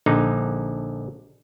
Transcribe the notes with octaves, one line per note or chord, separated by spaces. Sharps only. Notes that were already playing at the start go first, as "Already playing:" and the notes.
A#1 D3 D#4